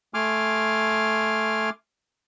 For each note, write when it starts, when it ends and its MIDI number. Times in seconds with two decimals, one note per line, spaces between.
0.14 1.70 57
0.14 1.70 80
0.14 1.70 84
0.14 1.70 86
0.14 1.70 89